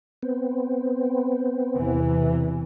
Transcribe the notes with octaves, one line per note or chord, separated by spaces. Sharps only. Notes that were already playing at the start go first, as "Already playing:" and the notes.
B3 C4
E2 C3 E3